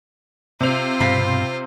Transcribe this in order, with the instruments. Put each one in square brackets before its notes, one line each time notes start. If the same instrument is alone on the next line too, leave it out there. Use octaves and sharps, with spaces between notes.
[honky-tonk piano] C3 F7 [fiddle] F4 C5
[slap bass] G2 B2 [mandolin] C4 F5 B5